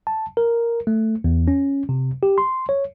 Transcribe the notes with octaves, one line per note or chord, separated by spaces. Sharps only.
A5
A#4
A3
E2
C#4
C3
G4
C6
C#5